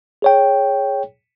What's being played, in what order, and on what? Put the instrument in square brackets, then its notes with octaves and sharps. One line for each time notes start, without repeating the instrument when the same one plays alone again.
[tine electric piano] G#4 C#5 G5